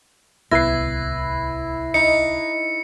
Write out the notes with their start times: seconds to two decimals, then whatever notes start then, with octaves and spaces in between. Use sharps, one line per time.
0.51 D1 C2 B3 E4 B4 A#6 C7
1.94 D#4 C#7